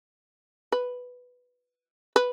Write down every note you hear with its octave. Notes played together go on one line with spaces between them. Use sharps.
B4
B4